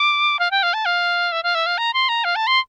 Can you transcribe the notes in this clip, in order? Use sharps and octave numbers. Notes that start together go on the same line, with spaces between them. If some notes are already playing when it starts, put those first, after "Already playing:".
Already playing: D6
F5
G5
F5
A5
F5
E5
F5
E5
F5
A#5
C6
A#5
F5
A5
C6